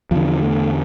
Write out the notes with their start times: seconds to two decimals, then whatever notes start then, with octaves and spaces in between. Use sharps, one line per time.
0.11 E2 D3 F3
0.42 A3